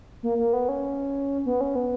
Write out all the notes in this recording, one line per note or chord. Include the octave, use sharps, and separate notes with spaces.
A#3
A#3
B3
C#4
B3
C#4
B3